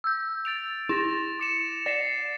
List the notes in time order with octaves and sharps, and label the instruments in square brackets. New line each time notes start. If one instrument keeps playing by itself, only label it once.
[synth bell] E6 G6
[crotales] A6 D7 F7
[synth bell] E4 [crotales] A6 A#6 E7
[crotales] D6 C#7 E7
[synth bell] D5 [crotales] A6 C7 E7